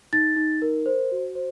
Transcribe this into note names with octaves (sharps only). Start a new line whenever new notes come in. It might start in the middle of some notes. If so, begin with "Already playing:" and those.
D#4 A6
D#4
A#4
C5
F#4
C5